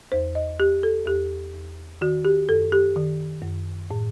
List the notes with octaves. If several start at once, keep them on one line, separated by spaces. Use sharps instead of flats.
E2 C5
D#5
E2 G4
A4
E2 G4
E2
D#3 F#4
G4
F#2 A4
G4
D#3
F#2
A2